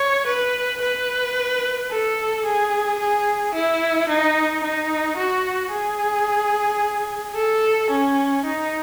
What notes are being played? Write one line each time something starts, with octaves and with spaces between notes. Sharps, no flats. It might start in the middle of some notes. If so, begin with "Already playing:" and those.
Already playing: C#5
B4
B4
A4
G#4
G#4
E4
D#4
D#4
F#4
G#4
A4
C#4
D#4